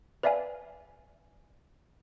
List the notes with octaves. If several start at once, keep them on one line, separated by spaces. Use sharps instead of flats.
B4 D5 E5 F5 G#5